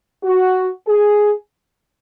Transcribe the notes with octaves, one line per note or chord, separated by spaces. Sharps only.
F#4
G#4